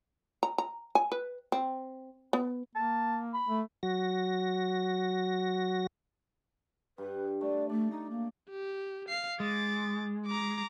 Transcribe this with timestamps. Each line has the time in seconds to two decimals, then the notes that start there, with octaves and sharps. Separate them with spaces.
0.43 A#5
0.58 A#5
0.95 G#5
1.12 B4
1.52 C4
2.33 B3
2.76 A#3 A5
3.34 B5
3.49 A3
3.83 F#3 F#4 A#6
6.98 G2 B4
7.41 A3 D5
7.69 A3 D4 D5
7.90 D#4
8.10 A#3
8.50 G4
9.09 F5 C7
9.40 G#3 D6 A6
10.27 A#5 D6